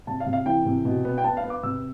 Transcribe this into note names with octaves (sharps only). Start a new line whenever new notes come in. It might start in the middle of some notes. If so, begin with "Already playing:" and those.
C3 A5
F5
C3
F5
E3 G5
C3
B2
B3
G5
B3 A5
F5
B3
D6
C3 E6